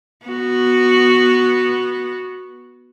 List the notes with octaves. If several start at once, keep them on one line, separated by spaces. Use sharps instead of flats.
B3 F#4